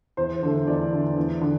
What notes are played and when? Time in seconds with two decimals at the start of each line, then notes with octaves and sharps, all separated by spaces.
0.17 E2 C5
0.43 D3 A3
0.67 E2 D5
0.92 D3 A3
1.17 E2
1.41 D3